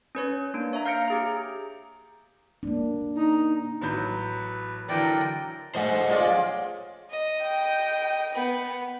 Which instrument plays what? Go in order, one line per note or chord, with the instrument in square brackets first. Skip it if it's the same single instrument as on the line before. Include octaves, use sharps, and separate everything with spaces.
[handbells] C#4 B4 C#5
A#3 D4 D7
C#5 E5 A#5
F5 F6 G6 A#6 C#7 D7
G4 G#4 A#5
[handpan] A#3 D4
[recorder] D#4
[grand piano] A1 F#3 G6 [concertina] B4
[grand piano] D3 E3 F#3 [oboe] A#4 [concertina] D5 [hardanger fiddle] G5
[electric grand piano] F3 A3 [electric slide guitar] C5 D#5 F#5
[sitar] C#4 F4 D5 [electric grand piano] G#4
[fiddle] D#5
[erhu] G5
[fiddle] B3